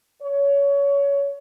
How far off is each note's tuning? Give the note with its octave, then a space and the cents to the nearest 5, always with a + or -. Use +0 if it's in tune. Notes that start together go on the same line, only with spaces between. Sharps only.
C#5 +20